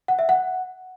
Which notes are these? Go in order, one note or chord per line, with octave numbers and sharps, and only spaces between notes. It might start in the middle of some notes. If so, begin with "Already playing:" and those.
F#5
E5
F#5